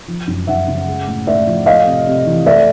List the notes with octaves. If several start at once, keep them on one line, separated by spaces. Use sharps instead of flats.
F3
F#2
F#2 E5 F#5
C#3
G#3
A2
A2 D5 E5
F3
A3 D#5 F5
C3
C3
E3
A3 D5 E5